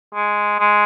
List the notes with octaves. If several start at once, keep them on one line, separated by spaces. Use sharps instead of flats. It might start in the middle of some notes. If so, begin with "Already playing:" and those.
G#3
G#3